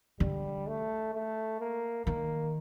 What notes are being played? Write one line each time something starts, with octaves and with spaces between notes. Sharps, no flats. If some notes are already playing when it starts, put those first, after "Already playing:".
D3 G3
A3
A3
A#3
D#3 A#3